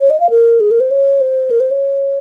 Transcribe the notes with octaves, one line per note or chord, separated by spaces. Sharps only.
C#5
D#5
F5
A#4
G#4
A#4
C5
C#5
C5
A#4
C5
C#5